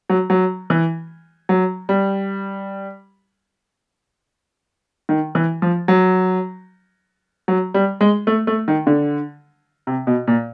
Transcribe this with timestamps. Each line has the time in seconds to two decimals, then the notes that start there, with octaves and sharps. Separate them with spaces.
0.10 F#3
0.30 F#3
0.70 E3
1.49 F#3
1.89 G3
5.09 D#3
5.35 E3
5.62 F3
5.88 F#3
7.48 F#3
7.74 G3
8.01 G#3
8.27 A3
8.47 A3
8.68 D#3
8.87 D3
9.87 C3
10.07 B2
10.27 A#2